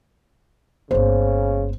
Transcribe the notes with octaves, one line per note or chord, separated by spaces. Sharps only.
G1 C#3 A#3 C5